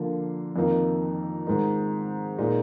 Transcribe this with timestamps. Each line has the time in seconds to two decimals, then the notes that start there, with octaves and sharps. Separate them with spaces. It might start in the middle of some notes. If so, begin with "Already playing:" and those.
Already playing: D3 F3 A#3
0.56 F2 D#3 A#3 D#4
1.47 G#2 D#3 G#3 D#4
2.39 A#2 G#3 D#4